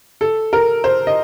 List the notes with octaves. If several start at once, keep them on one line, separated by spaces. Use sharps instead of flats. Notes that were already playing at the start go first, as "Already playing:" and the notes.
A4
A#4
C5
D#5